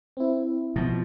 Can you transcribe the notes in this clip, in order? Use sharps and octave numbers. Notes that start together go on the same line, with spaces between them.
C4 E4
B2 F3